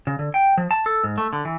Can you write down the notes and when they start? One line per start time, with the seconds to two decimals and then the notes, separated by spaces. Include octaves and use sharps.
0.07 C#3
0.19 D3
0.34 G5
0.58 F3
0.71 A5
0.86 A4
1.04 G#2
1.18 A3
1.33 D3
1.45 E3